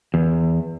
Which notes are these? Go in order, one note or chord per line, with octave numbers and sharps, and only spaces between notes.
E2